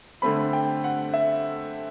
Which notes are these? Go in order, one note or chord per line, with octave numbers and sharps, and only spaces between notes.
D3 A3 C4 B5
G5
F#5
E5